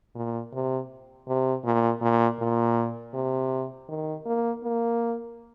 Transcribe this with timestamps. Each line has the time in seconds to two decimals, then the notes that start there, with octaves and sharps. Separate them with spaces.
0.15 A#2
0.53 C3
1.28 C3
1.64 A#2
2.01 A#2
2.39 A#2
3.14 C3
3.89 D#3
4.26 A#3
4.63 A#3